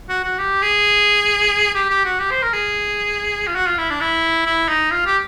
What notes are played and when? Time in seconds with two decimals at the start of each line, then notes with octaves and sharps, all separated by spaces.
0.09 F#4
0.24 F#4
0.38 G4
0.62 G#4
1.74 G4
1.90 G4
2.05 F#4
2.19 G4
2.31 C5
2.42 A#4
2.53 G#4
3.47 F4
3.55 F#4
3.67 F4
3.78 E4
3.90 D4
4.01 E4
4.46 E4
4.68 D#4
4.91 F4
5.06 G4